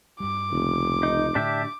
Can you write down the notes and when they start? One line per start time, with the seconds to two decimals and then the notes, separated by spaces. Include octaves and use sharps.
0.20 G2 G3 D6
0.52 F1 C#2 C#3 A#3
1.03 D#4
1.35 A2 D3 D4 G4 E5